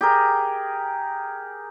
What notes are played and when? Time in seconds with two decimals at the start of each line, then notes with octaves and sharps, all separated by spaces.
0.01 G4 G#4 A#4